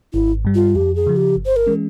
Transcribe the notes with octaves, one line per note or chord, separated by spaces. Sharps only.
G#1 E4
G2 G3
F4
F2 G4
G#4
C#3 F3
G4
G1
C5
A#4
E3 G#3 C#4